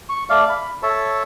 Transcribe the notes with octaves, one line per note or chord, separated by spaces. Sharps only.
C#6
A3 D5 F5
B5
A4 C#5 E5 A5